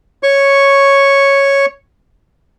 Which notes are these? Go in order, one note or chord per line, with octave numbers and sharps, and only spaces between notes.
C#5 C#6